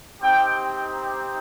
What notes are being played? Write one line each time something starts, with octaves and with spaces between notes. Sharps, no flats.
C4 D#4 G4 G5